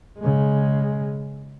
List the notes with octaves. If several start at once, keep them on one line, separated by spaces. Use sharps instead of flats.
C#3 G#3